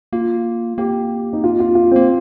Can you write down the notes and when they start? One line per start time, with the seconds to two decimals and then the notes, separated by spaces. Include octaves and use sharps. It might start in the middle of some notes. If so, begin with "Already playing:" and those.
0.13 A#3 F4
0.78 A#3 G4
1.33 D#4
1.44 F4
1.60 F4
1.75 F4
1.91 C4
1.96 A#3